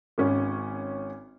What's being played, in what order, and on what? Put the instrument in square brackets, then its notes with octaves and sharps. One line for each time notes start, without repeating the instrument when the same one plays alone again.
[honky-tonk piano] G#1 C#4